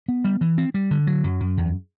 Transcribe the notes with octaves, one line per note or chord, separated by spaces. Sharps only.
B3
G3
E3
C4
G3
D3
F#3
F#2
F#2
E2